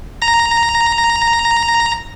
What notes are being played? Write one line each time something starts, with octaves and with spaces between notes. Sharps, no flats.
A#5 A#6